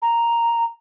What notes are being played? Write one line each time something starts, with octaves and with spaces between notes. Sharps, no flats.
A#5